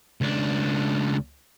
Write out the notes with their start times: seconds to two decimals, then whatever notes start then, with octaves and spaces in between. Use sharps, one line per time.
0.21 C#2 D4